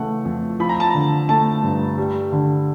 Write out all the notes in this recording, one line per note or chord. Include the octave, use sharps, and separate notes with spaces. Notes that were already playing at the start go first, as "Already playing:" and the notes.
Already playing: C#3 E3 A3 F#5
F2
F3 B5
A#5
A5
D3 A#5
A3 A5
G2
G3
D3